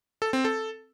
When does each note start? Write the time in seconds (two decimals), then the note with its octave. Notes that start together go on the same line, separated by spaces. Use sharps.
0.22 A4
0.33 C4
0.45 A4